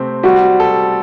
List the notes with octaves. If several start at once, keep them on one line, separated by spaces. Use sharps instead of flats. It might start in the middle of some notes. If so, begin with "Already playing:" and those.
Already playing: C3 A3 C4
G3 F#4
A4